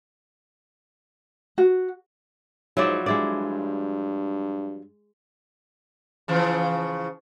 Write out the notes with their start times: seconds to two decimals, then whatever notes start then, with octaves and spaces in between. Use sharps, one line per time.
1.58 F#4
2.77 G#2 F3 F#3 E4 D5 E5
3.06 G2 G#3 E4 D5
6.28 C#3 E3 F3